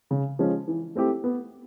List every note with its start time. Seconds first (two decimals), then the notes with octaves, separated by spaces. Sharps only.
0.11 C#3
0.39 F3 G#3 C#4
0.68 E3
0.95 A3 C4 E4 G4
1.24 B3